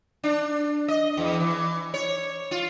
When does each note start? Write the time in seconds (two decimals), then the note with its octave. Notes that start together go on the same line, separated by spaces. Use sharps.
0.24 D4
0.88 D#5
1.17 E2
1.40 E3
1.94 C#5
2.51 F4